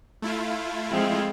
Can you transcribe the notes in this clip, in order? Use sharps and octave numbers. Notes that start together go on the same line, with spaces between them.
A3 E4 F4
F3 G#3 C4